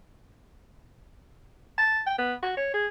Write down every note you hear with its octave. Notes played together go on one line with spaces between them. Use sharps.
A5
G5
B3
F#4
C#5
G#4